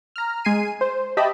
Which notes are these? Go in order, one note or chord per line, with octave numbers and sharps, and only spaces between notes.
A#5 F6
G#3 G#5 C7 D#7
C5
G4 D#5 E5 A5 B5